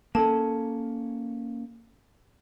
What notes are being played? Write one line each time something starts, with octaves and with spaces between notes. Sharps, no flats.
A#3 C#4 A4 A5